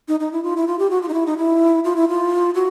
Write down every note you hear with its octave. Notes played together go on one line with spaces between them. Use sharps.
D#4
D#4
E4
F4
E4
F4
G4
F#4
F4
D#4
E4
D#4
E4
F4
E4
F4
F#4